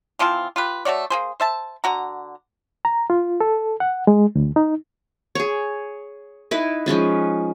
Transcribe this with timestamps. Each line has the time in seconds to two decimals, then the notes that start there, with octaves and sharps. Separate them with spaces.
0.19 E3 F3 C4 F4
0.56 F4 G4 B4
0.85 A3 F#4 C#5 D5
1.10 A#3 G#4 C5
1.40 C5 E5 A5
1.84 D3 F#4 A#5
2.85 A#5
3.10 F4
3.41 A4
3.80 F#5
4.07 G#3
4.35 D2
4.56 D#4
5.35 G#4 C#5
6.51 D#4 E4 B4
6.86 F3 G#3 C#4 B4